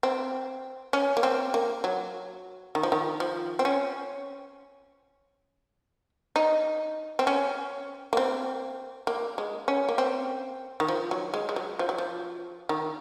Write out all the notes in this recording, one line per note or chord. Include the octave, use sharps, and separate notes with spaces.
C4
C#4
A#3
C4
A#3
F#3
D#3
F3
D#3
F3
C4
C#4
D#4
C4
C#4
A#3
C4
A#3
G#3
C#4
A#3
C4
D#3
F3
F#3
G#3
G#3
F#3
F3
F#3
F3
D#3